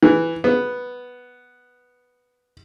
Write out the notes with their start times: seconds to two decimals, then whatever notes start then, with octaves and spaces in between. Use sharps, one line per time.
0.03 E3
0.44 B3